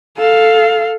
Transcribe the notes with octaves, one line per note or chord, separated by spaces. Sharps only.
A4 F5